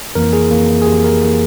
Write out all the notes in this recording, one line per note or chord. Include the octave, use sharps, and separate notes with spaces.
F2 E3 A#3 A#4
G#4
F2 E3 A#3
G#4
F2 E3 A#3 G4
A#4
E3 A#3